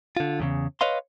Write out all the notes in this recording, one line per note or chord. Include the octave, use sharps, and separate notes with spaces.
D3 F4
E2 A2 C#3
B4 C#5 D#5 F5 C6